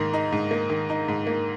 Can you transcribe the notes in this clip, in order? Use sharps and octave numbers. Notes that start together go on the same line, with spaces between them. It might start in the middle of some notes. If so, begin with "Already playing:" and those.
Already playing: G#2 D#3 A#3
D#4
G#2
A#3
D#3
D#4
G#2
A#3